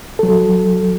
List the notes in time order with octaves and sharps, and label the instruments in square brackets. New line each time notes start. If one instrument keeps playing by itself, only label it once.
[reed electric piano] F#3 A4